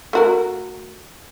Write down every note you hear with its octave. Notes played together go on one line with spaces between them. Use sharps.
A3 F#4 A#4